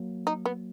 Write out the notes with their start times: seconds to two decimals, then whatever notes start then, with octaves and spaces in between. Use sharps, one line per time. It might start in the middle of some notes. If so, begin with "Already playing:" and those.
Already playing: F#3 A#3
0.27 D#4
0.46 B3